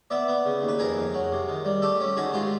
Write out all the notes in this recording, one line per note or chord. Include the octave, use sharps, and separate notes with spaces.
B3 D5 E5
B3
C#3
D#2
B4
F2 G#4 A#4
F2
F#3
C3
D#3
G3
A3 G4 A4
C#4
D#3 F#4 G#4
G#2 F4 G4